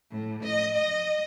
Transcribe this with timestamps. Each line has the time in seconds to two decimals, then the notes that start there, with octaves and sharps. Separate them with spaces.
0.11 A2
0.43 D#5
0.75 D#5